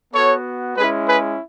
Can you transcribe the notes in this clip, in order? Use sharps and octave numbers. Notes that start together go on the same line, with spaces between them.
B3 F#4 A4 C#5
G#3 C#4 E4 G#4 B4
G#4 B4